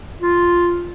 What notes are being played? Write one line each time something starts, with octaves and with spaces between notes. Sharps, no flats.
F4